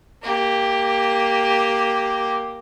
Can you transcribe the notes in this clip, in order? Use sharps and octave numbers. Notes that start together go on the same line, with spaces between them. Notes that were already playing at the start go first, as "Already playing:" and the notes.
A#3 G4